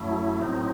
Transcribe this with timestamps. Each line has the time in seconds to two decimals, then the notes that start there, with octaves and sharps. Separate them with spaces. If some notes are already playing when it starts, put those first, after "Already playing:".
Already playing: F#2 F#3 A3 E4
0.40 A2 F#3 C4 D#4